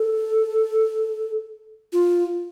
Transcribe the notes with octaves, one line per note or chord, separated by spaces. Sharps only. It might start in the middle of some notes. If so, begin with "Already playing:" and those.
Already playing: A4
F4